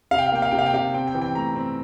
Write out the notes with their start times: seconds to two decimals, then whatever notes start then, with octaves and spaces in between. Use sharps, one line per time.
0.11 C3 F5
0.18 G5
0.26 F5
0.32 A#3 G5
0.42 F5
0.51 C3 G5
0.59 F5
0.66 G5
0.74 C3 F5
0.94 C4 G5
1.07 G5
1.15 E3
1.22 G5
1.35 A3 A#5
1.55 C4